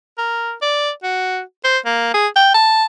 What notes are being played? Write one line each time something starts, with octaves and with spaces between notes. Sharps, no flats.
A#4
D5
F#4
C5
A#3
G#4
G5
A5